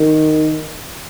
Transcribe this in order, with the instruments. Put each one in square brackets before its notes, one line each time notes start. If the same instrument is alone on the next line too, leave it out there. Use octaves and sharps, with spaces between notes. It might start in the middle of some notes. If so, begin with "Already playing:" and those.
Already playing: [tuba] D#3